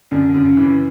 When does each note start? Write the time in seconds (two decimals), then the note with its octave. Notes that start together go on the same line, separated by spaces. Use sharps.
0.11 F#2 D3
0.29 D3
0.34 F#2
0.45 C#3
0.57 E3
0.62 C#3